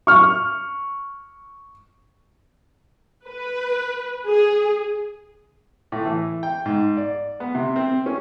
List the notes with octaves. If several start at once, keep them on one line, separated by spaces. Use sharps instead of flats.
C#6 F6
B4
G#4
A2
E3
G5
G#2
D5
B3
C3
C4
C#4